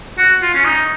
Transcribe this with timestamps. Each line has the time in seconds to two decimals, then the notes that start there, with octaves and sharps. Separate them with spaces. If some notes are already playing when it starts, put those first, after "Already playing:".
0.18 F#4
0.42 F4
0.54 C#4
0.65 D#4